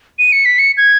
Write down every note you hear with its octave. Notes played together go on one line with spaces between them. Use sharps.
D#7
C#7
B6
C#7
G#6